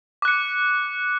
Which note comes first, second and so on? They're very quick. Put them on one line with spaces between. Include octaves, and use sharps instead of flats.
D6 F#6 C#7